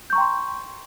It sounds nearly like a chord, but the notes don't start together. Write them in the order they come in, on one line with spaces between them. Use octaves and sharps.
G6 C#6 A#5 G5 C6